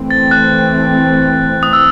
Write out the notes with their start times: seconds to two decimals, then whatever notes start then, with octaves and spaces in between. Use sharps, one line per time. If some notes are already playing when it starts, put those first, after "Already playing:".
Already playing: E3 A3 C4
0.11 A6
0.31 F#6
1.63 D#6
1.73 E6